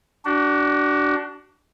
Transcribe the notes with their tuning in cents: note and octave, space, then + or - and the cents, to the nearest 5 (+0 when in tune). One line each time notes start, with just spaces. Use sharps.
D4 +0 F#4 +35